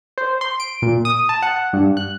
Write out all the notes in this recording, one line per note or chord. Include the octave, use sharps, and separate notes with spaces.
C5
C6
D7
A#2
D#6
A5
F#5
G2
F#6